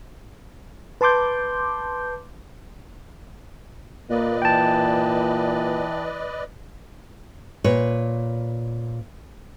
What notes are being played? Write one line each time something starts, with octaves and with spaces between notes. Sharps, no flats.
B4 A5 C6 D6 G6
A#2 A#3 B4 D5 D#5
E3 G5 A5
A#2 B4 C#5